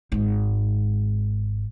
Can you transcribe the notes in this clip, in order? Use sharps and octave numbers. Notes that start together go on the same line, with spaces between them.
G#1 G#2